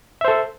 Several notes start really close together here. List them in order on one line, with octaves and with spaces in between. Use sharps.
E5 C5 A4